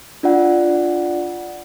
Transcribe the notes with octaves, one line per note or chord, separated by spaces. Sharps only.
D4 F4 D5 F#5